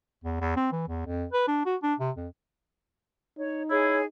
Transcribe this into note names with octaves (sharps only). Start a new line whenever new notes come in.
E2
E2
C4
E3
E2
F2
B4
D4
F#4
D4
C3
F2
D#4 C#5
E4 G#4 C#5